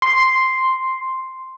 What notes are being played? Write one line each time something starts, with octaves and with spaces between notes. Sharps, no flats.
C6